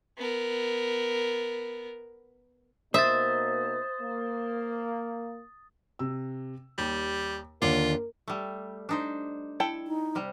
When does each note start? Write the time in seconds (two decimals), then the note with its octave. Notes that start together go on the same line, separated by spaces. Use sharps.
0.18 B3 A#4
2.94 B2 A#3 D#4 C5 E5 D#6 A6
4.01 A#3
5.99 C3 E6
6.78 D#2 G3
7.62 D#2 D3 F4 A#4 D6
8.28 G3 A3
8.89 D4 D#4 C5
9.60 E4 A4 G5
9.87 D#4
10.15 C3 G3